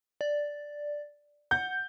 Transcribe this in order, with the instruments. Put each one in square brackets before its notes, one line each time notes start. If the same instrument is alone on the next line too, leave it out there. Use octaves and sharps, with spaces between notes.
[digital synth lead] D5
[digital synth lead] F#5 [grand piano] G6